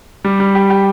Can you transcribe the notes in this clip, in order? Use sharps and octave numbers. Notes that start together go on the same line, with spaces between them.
G3
G3
G4
G4